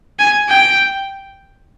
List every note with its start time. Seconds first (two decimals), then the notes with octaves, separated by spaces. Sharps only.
0.19 G#5
0.49 G5